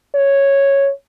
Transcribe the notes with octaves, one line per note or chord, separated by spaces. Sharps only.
C#5